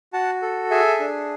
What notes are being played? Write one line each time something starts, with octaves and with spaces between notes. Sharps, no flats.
F#4 F#5 A5
A4
G#4 E5 G#5
D4